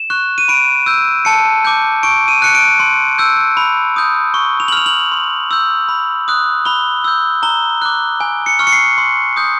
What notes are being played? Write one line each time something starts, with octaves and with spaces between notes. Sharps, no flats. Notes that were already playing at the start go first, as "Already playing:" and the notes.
Already playing: E7
C#6 F#6
D#7
B5 D7
E6 G6
A5 C#7
D6 G6
C#6 D7
D#7
F#6 C#7
D7
C6
E6 G6
B5
D#6 G6
C#6
F7
F#7
F6 F7
F#7
C6
E6 G6
B5
D#6 F#6
B5 G7
E6 G6
A#5 G7
D6 F#6
G#5
C#7
C#6 F6
C#7
C7
C6
D#6 G6